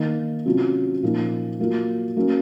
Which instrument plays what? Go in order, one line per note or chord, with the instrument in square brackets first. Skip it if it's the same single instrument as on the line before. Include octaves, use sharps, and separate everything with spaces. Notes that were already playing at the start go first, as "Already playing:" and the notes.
Already playing: [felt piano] D#3 A#3 D#4
C3 F#3 C#4 F4
A#2 F3 A#3 D#4
F#3 A#3 F4
F#3 A#3 C#4